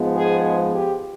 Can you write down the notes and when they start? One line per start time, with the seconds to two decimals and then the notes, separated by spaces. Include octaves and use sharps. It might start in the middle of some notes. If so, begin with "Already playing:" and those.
Already playing: G#2 F3 G#3 B3
0.17 G#4
0.75 G4